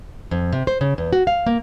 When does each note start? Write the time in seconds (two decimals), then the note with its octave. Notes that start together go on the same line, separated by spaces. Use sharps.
0.31 F2
0.52 C3
0.67 C5
0.81 C#3
0.98 E2
1.13 F#4
1.27 F5
1.46 A#3